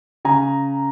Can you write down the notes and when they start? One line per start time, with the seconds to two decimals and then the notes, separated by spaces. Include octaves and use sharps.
0.25 C#3 G#5 A#5